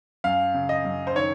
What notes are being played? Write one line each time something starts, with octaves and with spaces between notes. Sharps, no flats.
F#2 F5
C#3
D#5
F#2
C5
D#3 C#5